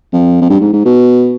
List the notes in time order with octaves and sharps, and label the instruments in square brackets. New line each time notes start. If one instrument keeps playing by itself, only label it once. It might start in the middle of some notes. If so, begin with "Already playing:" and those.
[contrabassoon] F2
F2
G2
G#2
G#2
B2